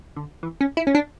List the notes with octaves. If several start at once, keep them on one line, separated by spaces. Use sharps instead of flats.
D3
E3
C#4
E4
C#4
D4